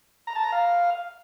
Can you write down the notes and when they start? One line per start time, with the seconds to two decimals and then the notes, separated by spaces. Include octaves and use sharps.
0.27 A#5
0.36 A5
0.44 A#5
0.52 F5